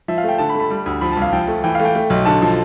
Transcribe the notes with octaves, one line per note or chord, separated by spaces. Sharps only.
F3 E5
F5
A3
G5
D3 A5
B5
A3
B5
G3
D2
F3 B5
C2 A5
F5
F3 G5
A3
E3 G5
A3 F5
G5
A3
B1
D3 A5
F3